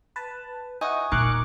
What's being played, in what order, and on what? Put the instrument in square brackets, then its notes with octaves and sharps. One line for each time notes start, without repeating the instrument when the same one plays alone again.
[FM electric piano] B4 A5
[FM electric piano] D#4 E4 F#4 [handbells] G#5 C#6 D#6
[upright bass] E1 A#2 [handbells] D#4 [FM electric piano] A#4 C#6 [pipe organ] D6 F#6